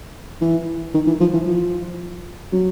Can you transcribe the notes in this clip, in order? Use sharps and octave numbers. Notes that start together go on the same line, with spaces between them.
E3
D#3
E3
F3
E3
F3
F#3